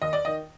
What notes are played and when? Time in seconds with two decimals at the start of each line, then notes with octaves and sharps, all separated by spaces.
0.02 D#2 D#5
0.13 D5
0.25 D#3 D#5